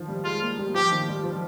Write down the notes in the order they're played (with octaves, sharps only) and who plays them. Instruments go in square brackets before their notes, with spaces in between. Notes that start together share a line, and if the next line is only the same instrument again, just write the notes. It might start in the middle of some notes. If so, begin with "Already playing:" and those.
Already playing: [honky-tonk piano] D#3 F3
G3
[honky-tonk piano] G#3 [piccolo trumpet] F4
[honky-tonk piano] A#3
G3
[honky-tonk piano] F3 [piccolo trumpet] G4
[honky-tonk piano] D#3
G3
F3